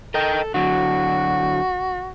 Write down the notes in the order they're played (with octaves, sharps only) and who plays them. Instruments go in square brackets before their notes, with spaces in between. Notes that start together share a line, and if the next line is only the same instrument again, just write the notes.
[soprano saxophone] A4 [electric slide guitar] A#4 D#5 G5
[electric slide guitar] D3 F#3 [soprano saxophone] F#4